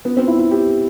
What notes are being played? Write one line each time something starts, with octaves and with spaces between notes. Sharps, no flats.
B3
C4
E4
E4
G4